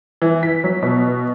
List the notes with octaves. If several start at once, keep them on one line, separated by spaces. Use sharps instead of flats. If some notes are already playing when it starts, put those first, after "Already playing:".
E3
B6
F#3
B2